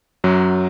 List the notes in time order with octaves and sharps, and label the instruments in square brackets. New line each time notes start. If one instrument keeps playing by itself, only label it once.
[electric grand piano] F#2 F#3